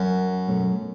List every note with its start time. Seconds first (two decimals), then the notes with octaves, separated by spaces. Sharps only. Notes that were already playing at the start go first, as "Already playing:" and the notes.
Already playing: F#2
0.48 B2 F#3 A3 C#4